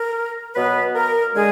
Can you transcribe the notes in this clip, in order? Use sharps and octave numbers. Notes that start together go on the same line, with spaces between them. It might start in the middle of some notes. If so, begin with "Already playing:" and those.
Already playing: A#4
B2 F#3 B3 B4
A#4
D3 G#3 G#4